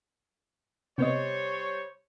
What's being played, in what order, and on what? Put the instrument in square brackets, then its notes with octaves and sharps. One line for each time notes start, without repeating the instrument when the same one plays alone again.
[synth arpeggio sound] C3 B3 D#5 [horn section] G3 C5 C#5